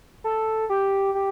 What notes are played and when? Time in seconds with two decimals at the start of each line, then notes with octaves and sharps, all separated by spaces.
0.24 A4
0.70 G4
1.15 G4